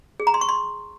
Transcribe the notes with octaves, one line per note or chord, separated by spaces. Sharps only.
G#4
A#5
C6
C#6
C6